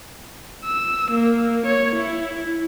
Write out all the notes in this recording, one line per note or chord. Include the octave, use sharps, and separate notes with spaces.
E6
A#3
C#5
E4